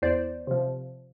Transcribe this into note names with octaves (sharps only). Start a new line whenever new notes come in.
E2 C5 D5
C3 F3